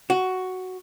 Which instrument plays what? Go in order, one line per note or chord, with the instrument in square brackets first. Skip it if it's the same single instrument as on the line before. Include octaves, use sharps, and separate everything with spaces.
[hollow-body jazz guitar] F#4